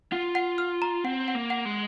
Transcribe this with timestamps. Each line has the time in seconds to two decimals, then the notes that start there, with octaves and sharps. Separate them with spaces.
0.12 F4 F#5
0.35 F#5
0.58 F6
0.82 A#5
1.04 C4 F#5
1.28 F#5
1.35 A#3
1.50 F#5
1.65 G#3